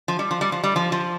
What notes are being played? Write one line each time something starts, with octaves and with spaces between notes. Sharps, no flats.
F3
G3
F3
G3
F3
G3
F3
F3